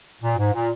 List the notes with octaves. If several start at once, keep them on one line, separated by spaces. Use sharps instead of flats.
A#2
G#2
A#2